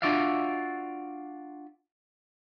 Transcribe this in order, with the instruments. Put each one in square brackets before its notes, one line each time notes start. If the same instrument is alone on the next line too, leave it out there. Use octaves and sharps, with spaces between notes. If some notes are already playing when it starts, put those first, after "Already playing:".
[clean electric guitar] D4 F4 F#4 D5 E5 F5